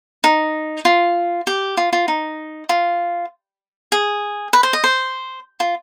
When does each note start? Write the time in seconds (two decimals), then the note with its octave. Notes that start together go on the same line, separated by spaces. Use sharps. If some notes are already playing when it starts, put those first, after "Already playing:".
0.24 D#4
0.85 F4
1.47 G4
1.77 F4
1.93 F4
2.08 D#4
2.69 F4
3.92 G#4
4.53 B4
4.63 C5
4.73 D#5
4.84 C5
5.60 F4